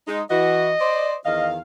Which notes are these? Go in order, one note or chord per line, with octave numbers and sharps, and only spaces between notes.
G#3 D#4
E3 F#4 D#5
C5 D5
E2 D#3 D#5 F5